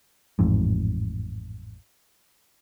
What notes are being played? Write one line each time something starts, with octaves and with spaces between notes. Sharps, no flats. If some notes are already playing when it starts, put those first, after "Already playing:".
A1 F2 G#2